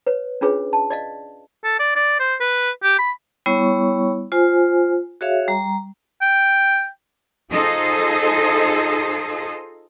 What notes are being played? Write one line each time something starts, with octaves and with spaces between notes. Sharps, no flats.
B4 C#5
C#4 D4 F4 G#4 B4 C#5
A5
D5 D#5 F5
A4
D5
D5
C5
B4
G4
B5
G3 B3 E4 C#5 C#6
F4 C5 G#5
F#4 G#4 C#5 E5 F5
G3 A#5
G5
D#4 F4 G#4 A4 C5 D#5